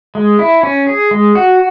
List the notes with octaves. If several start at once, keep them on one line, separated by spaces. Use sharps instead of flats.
G#3
E4
C#4
G#4
G#3
F#4